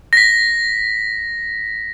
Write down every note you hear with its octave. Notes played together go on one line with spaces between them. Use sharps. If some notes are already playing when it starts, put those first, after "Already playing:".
A#6 B6